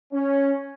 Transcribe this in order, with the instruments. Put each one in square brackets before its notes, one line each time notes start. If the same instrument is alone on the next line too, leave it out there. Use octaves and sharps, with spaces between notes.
[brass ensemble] C#4